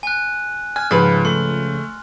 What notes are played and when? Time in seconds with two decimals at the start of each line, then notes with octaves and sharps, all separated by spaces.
0.03 G#5 F#6
0.76 G#5 F6
0.91 C#2 G#2 F3 B4 A6
1.25 A3 C6